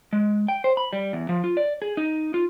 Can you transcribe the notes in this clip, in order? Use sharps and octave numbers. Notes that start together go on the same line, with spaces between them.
G#3
G5
C5
B5
G3
E2
F3
F4
D5
G#4
D#4
F4